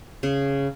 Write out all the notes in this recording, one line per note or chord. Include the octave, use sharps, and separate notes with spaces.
C#3